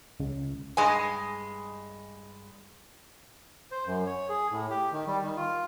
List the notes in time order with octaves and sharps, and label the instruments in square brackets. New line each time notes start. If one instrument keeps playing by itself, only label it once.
[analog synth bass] C#2
[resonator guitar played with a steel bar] G2 G#3 D#5 G#5
[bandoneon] C5
F#2
C#5
G#4
A2
G4
D#3
G3
D#3
F4